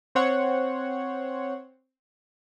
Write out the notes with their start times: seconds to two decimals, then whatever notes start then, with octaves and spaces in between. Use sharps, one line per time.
0.15 C4 C5 C#5 F#5